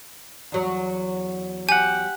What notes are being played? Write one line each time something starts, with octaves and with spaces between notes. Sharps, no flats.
E2 F#3
G4 F#5 G#5